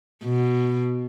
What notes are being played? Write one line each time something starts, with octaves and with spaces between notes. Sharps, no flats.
B2